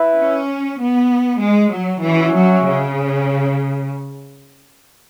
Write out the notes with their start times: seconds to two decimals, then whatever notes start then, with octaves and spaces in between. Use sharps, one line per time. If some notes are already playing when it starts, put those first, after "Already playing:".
Already playing: E4 B4 E5
0.16 C#4
0.79 B3
1.40 G#3
1.72 F#3
2.03 E3 C#4 F#4 C#5 E5
2.34 F#3
2.66 C#3